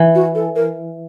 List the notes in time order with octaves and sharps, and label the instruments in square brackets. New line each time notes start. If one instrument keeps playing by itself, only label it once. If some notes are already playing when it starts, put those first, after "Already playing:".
Already playing: [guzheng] E3
[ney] F#4
A4
A#4